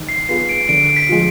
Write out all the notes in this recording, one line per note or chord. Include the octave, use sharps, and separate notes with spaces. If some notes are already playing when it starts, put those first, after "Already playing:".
Already playing: D#3
C7
B3 F4 G#4 C7
D7
D3 D7
B6
F3 G#3